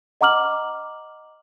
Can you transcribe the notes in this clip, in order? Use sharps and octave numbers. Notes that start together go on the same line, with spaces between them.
D#5 F#5 A#5 D6 F6 F#7